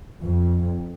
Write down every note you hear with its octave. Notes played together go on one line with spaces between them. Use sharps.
F2